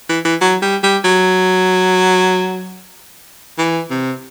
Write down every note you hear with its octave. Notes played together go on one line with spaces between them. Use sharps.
E3
E3
F#3
G3
G3
F#3
E3
C3